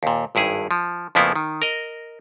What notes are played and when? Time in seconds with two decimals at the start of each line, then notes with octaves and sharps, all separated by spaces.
0.03 D#2 A#2
0.35 G#1 G2 E4 G#4
0.71 F3
1.15 F2 C#3 F3 A#3 B3 E4
1.36 D#3
1.62 A#4 D#5